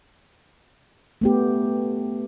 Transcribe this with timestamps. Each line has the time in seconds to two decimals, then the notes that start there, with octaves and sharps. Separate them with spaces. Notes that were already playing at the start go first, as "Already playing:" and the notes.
1.21 A3 B3 G4